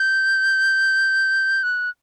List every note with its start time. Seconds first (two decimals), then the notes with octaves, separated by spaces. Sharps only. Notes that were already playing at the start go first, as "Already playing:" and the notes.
Already playing: G6
1.63 F#6